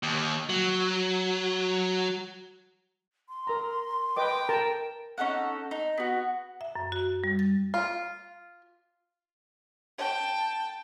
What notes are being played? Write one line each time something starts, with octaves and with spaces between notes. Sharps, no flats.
D#2
F#3
C6
A#4 A#5
B4 D#5 G5 D6
A#4 A5
C#4 D#4 A4 F#5
D#4
B3 F#4
E5
F#2
F#4
G3
A6
F4
G5 A5